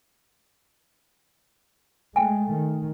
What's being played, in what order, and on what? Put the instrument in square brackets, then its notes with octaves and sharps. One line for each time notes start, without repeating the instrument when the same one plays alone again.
[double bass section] G#3 A3 [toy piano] G5 G#5
[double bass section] D#3